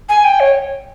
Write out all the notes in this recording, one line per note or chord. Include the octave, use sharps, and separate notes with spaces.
G#5
G5
C#5